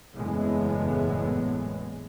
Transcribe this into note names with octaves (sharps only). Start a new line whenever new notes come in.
F#1 E2 A2 G#3 B3